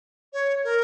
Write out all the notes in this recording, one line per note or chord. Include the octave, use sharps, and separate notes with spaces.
C#5
A#4